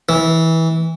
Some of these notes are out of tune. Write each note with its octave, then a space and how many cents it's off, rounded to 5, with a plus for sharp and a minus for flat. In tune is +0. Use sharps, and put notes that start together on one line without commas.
E3 -20